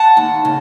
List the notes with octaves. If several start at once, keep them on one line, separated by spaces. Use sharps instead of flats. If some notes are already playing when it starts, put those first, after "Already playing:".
Already playing: F#5 A5
D#2
C#3